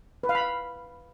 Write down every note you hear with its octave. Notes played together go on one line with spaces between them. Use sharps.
B4
F5
B5
F5